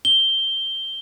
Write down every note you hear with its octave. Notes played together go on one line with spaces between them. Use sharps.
G7